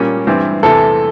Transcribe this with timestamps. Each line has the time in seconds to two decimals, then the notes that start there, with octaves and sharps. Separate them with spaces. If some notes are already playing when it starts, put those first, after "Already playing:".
Already playing: A#2 G3 A#3 C#4
0.27 G2 E3 G3 C4
0.63 E2 C3 E3 A4